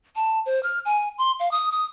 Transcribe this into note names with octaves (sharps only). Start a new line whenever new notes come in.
A5
C5
F6
G#5
C6
F5
D#6
D#6